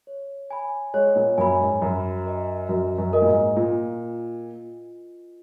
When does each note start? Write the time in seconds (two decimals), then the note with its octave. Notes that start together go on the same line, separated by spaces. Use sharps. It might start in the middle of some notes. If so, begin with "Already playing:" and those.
0.07 C#5
0.51 G#5 B5
0.94 G#3 C#5
1.16 A#2
1.38 F#2 G#5 B5
1.60 G#2
1.82 F#2 F#4
2.26 A#4 D#5 G#5
2.69 F#2 F#4
2.98 F#2
3.13 A#4 D#5 G#5
3.22 A#2
3.28 G#2
3.56 A#2 F4